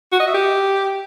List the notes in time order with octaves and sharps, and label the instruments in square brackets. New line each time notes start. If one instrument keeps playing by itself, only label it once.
[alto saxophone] F#4
D#5
E5
G4